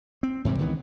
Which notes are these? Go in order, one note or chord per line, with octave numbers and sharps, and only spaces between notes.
C4
G#2 C3 E3 G3
C#2 D#3 E3 B3